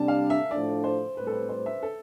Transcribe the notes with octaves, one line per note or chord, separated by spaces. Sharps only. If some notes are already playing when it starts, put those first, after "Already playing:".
Already playing: C3 G3 D4 A5
F5
E5
A2 F3 A3 D4 D5
C5
A2 G3 C4 B4
A4
B4
C5
E5
A4